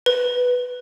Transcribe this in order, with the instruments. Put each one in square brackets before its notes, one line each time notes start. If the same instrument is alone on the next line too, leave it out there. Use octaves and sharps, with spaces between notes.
[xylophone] B4